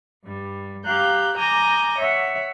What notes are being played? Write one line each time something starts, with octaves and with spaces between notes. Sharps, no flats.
G2 G3
G4 F5 A#5 F#6 G6
G#5 A#5 D6 D#6 G6 A#6
C#5 E5 F#5